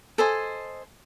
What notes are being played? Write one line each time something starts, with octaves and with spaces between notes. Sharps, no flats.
A4 C5 D#5 G#5